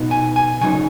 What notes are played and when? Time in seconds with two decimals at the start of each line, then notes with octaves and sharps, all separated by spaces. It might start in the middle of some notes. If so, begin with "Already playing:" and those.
Already playing: B2 B3 D#4
0.11 G#5
0.36 G#5
0.61 C#3 F#3 D#4 G#5